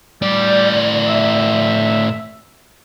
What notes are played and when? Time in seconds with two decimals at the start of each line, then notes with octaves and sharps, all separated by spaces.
0.22 A2 G3 D5
1.08 E5